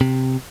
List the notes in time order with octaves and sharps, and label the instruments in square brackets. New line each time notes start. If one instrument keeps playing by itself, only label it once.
[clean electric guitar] C3